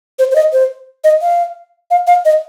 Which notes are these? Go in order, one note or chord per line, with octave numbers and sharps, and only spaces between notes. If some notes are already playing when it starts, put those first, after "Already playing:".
C5
C5
D#5
C5
D#5
F5
F5
F5
D#5